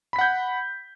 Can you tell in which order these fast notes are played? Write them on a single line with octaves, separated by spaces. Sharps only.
B5 B6 F#5 G6